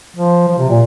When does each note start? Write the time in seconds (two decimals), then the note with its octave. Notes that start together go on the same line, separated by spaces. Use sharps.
0.16 F3
0.48 F3
0.59 C3
0.69 A#2